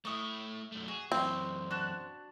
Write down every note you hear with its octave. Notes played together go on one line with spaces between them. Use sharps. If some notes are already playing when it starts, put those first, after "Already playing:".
A3 E4 C#6 D#6
F#2 A3
F#4 G#4
F#2 E3 C4
D4 F#4 F#6